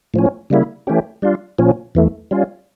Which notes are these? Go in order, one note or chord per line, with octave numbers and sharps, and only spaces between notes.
A2 F3 C#4
C#3 G3 A#3 E4
E3 A3 C#4 G4
G3 D4 F4
A#2 F3 C#4
E2 E3 A3
G3 C#4 F4